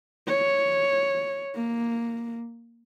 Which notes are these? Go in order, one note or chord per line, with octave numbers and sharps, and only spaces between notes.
C#5
A#3